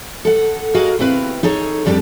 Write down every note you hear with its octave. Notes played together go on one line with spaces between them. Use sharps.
A4 F#5
F#4 G#4 A#4 D#5 F5 F#5
D#2 C4 E4 B4 F5
D#4 G#4 A4 C#5
F2 G3 D4 G4 A4